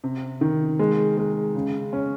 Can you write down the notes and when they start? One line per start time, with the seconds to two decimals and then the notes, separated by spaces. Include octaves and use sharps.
0.04 C3
0.41 D#3
0.79 G#3
1.17 G#3
1.55 C#3
1.93 C#4